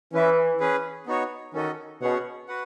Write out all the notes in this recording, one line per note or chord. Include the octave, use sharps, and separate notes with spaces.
E3 C#4 E4 B4 E5
C#4 G#4 B4
B3 D#4 F#4 C#5
D#3 C#4 F#4 A4 D#5
B2 C#4 G#4 C#5 F#5
F#4 B4 F#5